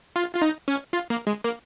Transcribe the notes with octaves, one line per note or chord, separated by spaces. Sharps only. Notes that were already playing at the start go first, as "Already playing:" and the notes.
F4
F4
D#4
C#4
F4
A#3
G#3
A#3